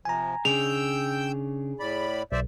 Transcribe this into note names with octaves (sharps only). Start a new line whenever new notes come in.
C3 F3 G#5 A#5
C#3 D4 G#4 G5 E6 G6 F7
A2 D5 B5
B1 C5 D5 E5